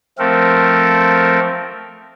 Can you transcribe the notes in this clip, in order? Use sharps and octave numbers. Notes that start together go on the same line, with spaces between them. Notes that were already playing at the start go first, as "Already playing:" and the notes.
F3 A3 C4 A4 A#4